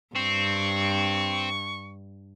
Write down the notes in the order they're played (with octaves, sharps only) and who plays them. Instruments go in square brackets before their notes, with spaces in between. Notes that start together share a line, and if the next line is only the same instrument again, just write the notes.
[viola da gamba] G2 [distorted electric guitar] C4 [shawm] C#6